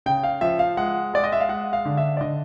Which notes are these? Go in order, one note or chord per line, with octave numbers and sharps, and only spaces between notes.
C#3 G5
F5
F3 E5
F5
G#3 F#5
G#3 D5
D#5
E5
F5
G#3 F#5
F5
D3
E5
D5
D3 D#5